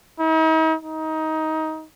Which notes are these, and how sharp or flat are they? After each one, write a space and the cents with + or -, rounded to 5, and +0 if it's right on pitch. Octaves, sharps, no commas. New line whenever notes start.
D#4 +45
D#4 +20